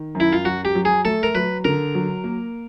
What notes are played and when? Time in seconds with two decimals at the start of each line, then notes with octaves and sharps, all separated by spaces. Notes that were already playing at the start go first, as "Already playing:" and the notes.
Already playing: D#3
0.15 F#2
0.20 E4
0.33 F4
0.45 F#3 F#4
0.65 G4
0.75 F#3
0.85 G#4
1.05 A3 A4
1.23 A#4
1.35 F#3 B4
1.65 D3 A#4
1.95 F#3
2.24 A#3